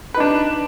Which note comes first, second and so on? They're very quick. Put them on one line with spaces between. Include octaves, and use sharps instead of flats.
B4 D#4 D4